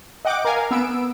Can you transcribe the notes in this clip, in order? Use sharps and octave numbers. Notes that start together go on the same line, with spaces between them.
D#5 F#5 G5 D6
A#4 F5 G#5
B3 E6 D7